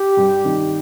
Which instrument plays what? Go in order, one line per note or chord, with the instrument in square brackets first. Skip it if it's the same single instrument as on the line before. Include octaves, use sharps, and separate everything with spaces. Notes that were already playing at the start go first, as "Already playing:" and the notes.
Already playing: [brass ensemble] G4
[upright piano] G2
D#3